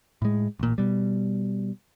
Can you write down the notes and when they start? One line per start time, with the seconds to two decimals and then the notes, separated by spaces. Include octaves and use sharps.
0.22 A2 G#3
0.59 A1 A#2
0.78 B2 G3